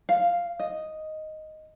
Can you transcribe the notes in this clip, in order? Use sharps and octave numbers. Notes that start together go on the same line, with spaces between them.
F5
D#5